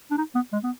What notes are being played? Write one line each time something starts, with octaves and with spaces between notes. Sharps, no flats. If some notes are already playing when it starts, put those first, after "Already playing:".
D4
D#4
B3
G#3
B3